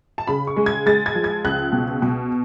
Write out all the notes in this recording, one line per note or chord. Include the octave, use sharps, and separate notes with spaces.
A5
C#3 B5
C#6
G#3
G#6
G#3 A6
G#6
F3
G#6
C#2 F#6
B2
B2